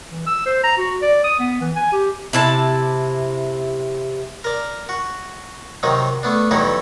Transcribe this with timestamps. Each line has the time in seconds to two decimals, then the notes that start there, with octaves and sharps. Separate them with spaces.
0.10 E3
0.26 E6
0.46 C5
0.63 A#5
0.78 F#4
1.02 D5
1.24 D#6
1.39 B3
1.61 E3
1.76 G#5
1.92 G4
2.33 C3 E4 A5
4.44 A#4 D5
4.89 F#4
5.83 C3 D#3 F#3 D#4
6.23 A3 B3 D4
6.51 E2 G2 F#3 D#4 E4 A4